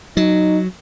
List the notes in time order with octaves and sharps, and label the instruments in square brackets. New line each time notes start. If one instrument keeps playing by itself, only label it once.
[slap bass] F#3 [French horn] D#4